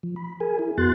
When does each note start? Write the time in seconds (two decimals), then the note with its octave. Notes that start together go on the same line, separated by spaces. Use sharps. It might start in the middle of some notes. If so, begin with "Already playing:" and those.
0.03 F3
0.16 B5
0.40 G#4 A#4 G#5
0.59 E4 G#4
0.78 F2 B3 F#4 C6 F#6 A6